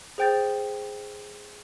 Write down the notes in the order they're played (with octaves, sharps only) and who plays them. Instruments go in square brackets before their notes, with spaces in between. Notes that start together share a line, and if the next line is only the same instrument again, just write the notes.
[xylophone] G#4 C5 G5 G6 A6